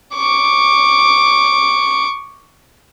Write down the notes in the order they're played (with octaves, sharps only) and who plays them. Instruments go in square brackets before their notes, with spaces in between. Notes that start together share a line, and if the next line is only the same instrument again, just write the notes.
[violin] C#6 D6